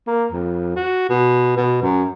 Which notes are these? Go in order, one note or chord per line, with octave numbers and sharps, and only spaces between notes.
A#3
F2
F#4
B2
B2
F#2